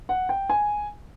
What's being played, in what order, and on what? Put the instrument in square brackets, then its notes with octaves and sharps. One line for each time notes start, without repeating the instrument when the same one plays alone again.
[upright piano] F#5
G5
G#5